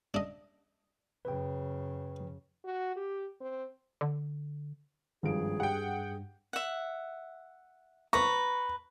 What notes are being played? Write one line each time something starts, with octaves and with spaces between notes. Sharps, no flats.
D4 D#5
F#2 C#3 B4 G5
F#4
G4
C4
D3
G#1 G2 F3 G#4 D7
G4 F#5 G5
E5 F#5
B4 A#5 C#6